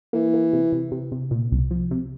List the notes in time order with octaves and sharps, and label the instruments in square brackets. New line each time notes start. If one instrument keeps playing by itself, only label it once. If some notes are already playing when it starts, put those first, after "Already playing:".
[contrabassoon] E3 [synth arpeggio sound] A#3
[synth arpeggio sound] A#3
C3
C3
C3
C3
A#2
C2
F3
C3